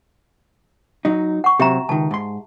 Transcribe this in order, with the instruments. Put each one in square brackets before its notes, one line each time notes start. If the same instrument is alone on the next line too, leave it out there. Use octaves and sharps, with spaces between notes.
[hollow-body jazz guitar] F#3 D#4
[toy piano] F#5 C#6
[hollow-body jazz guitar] C3 F#3 [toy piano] G4 E5 A#5
[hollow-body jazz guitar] C#2 D#3 [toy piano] A5
[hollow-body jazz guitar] G#2 C6